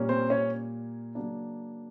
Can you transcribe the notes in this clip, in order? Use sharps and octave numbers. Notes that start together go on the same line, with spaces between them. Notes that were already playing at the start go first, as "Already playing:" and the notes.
Already playing: A#2 G3 A#3 C#4
C4 C5
C#4 C#5
C#3 F#3 A#3 D4